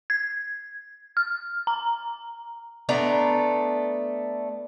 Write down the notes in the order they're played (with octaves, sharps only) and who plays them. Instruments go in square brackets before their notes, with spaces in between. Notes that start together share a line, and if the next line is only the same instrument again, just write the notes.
[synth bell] G#6
F6
A#5
[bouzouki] A3 B3 D4 A#5